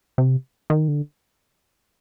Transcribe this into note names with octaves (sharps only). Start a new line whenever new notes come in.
C3
D#3
D3